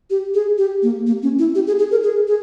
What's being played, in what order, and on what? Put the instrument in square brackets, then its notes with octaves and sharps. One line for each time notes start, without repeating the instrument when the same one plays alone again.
[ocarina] G4
G#4
G4
A#3
A#3
C#4
E4
G4
G#4
G#4
A#4
G#4
G#4